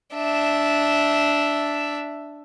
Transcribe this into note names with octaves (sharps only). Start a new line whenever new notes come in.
D4 E5